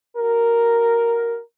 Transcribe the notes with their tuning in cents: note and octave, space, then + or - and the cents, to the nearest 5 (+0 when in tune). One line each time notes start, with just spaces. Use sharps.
F#4 +0 A#4 +0